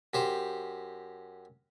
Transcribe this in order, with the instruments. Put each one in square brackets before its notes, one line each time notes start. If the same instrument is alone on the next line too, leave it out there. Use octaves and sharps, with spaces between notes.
[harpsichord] F#2 G4 C5